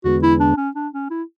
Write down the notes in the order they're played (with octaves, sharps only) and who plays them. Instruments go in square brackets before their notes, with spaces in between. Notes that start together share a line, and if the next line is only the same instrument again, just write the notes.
[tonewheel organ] E2 D3 G#3 B3 [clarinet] F#4
[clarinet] E4
D4
C#4
D4
C#4
E4